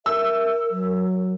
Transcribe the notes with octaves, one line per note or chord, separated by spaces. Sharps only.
A#4 E5 E6
F#3